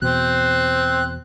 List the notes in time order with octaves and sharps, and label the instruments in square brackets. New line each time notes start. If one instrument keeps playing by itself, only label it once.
[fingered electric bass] E2 B2 [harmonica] C4 [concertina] F#6